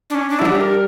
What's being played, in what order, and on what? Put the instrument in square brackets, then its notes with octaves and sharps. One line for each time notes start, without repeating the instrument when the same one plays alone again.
[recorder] D4
C#4
D4
E4
[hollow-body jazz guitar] F#3
[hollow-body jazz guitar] G3 [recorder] D4
[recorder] G4
A#4